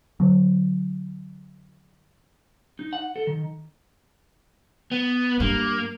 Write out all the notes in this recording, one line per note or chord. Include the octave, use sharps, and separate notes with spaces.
D3 F#3
D#4
F#5
A4
D#3
B3
G2 A#3